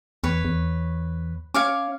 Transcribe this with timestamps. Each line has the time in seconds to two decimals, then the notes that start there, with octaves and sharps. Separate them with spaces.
0.24 E2 B4 C#5
0.45 E2
1.54 C#4 C#5 F5 D6